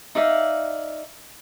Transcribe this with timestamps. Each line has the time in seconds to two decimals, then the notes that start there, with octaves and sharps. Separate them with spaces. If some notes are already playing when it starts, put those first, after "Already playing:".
0.15 D#4 D5 E5 F5